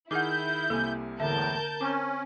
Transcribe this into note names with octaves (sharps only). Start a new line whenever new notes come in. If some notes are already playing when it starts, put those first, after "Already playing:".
D#3 E4 G#4 F#5 D6 F6 G6
C2 C3 A#3 A4 G#5
E2 A2 D3 A#4 E5 A5 G6
C4 C#4 D6